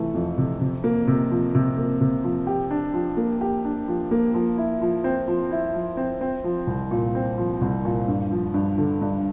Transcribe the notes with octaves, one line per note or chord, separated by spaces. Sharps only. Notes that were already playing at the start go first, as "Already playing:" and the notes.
Already playing: C3 E3 A3
F2
C3
C3
A#3
C3
F3
C3
A#3
C3
F3
G4
D4
F3
A#3
G4
D4
F3
A#3
F3
E4
F3
C4
F3
E4
F3
C4
C4
F3
C2
A#2
C4
F3
C2
A#2
G2
F3
G2
D3
G2